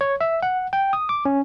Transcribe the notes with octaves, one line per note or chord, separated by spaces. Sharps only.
C#5
E5
F#5
G5
D#6
D6
C#4